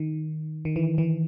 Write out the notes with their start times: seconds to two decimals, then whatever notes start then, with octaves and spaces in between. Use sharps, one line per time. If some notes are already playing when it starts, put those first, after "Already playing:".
Already playing: D#3
0.65 D#3
0.76 E3
0.98 E3